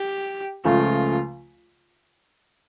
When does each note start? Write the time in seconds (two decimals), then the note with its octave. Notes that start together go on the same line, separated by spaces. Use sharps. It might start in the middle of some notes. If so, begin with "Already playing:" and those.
Already playing: G4
0.64 C#2 C#3 F3 A3 F4